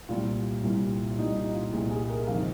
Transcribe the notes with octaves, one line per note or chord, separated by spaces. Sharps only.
C2 A#2 G3 F4
C2 A#2 G3
C2 A#2 G3 D#4
D#4
F4
C2 A#2 G3 G#4
G#4
A#4
G1 F2 C3 D#3 F5